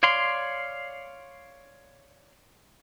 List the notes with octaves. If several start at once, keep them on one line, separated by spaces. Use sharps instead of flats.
C#5 D5 F5 C6